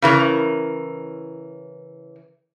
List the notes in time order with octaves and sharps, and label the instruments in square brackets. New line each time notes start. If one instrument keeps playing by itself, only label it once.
[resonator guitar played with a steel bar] C#3 E3 A#4